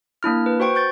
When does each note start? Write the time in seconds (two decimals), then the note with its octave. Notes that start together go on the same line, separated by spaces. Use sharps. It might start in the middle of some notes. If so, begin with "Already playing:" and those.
0.23 A#3 D4 E4 F6
0.46 B4
0.60 F#4 C5 G5 C#6
0.75 C#6 G6 A6